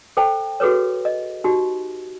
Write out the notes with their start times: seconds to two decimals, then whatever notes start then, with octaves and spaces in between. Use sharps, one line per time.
0.17 A4 C5 G5 A5
0.60 F#4 G#4 A4 B4 C#5
1.05 D#5
1.44 D#4 F#4 G4